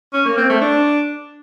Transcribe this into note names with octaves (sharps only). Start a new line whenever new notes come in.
C#4
A#3
C4
A3
D4